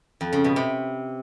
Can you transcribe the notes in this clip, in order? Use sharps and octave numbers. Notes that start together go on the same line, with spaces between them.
F2
C#3
B2
C3